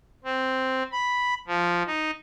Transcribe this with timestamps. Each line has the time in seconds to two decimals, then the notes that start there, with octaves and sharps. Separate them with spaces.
0.24 C4
0.92 B5
1.47 F3
1.87 D#4